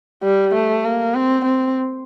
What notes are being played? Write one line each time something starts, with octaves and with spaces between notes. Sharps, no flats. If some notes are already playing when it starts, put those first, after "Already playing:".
G3
A3
A#3
C4
C4